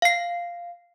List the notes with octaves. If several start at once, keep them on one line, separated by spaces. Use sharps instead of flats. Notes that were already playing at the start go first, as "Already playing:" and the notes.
F5 C7